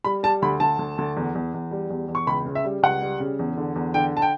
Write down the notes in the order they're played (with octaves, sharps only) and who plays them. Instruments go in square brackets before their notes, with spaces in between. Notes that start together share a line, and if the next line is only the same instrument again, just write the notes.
[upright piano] G3 B5
G3 A5
D2 B5
D2 A5
D2
D2
E2
E2
E2
G3
E2
E2
C#6
C#2 B5
C#3
E5
G3
C#2 F#5
G3
C#3
E2
D3
E2
D3 G5
A5
G5